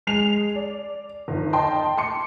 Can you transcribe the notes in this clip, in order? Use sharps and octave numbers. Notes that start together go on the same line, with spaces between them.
G#3 C7 F7
D5
G1 D#3
D#5 G5 A5 C6
C6 D6 C#7